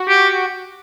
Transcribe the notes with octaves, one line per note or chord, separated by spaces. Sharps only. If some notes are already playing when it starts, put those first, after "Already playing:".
Already playing: F#4
G4